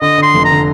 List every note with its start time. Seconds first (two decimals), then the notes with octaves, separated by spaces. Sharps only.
0.01 D3 D#5
0.18 D3 C6
0.34 F1
0.45 A#5
0.51 D3